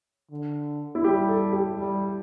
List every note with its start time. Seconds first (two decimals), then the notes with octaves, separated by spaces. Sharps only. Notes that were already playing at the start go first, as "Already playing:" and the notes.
0.31 D3
0.95 E4
1.04 G3 G4
1.28 A4
1.53 G4
1.77 G3